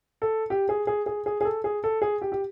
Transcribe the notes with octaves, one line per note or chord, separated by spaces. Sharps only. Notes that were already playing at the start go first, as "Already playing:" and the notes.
A4
G4
G#4
G#4
G#4
G#4
G#4
A4
G#4
A4
G#4
G4
G4